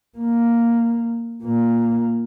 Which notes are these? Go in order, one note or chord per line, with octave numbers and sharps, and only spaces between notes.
A#3
A#2 A#3